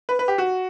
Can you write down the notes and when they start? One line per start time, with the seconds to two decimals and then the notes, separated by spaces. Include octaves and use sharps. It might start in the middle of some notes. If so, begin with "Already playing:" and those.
0.09 B4
0.19 B4
0.28 G4
0.38 F#4